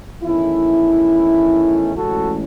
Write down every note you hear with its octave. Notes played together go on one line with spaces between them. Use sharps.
E2 D#3 A3 C#4 E4
A1 A2 G#3 C#4 F#4 A4